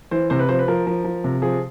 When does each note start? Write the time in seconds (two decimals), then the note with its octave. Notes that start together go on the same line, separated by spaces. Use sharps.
0.11 E3 C5
0.30 C3 C5
0.39 B4
0.49 F3 C5
0.59 B4
0.68 F3 A#4
0.87 F3
1.04 F3
1.24 C3
1.42 F3 G#4